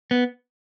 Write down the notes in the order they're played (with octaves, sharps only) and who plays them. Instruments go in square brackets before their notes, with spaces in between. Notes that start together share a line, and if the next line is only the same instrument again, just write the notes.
[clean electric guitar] B3